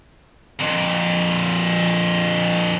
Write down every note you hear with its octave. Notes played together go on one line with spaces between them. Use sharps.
F2 A#2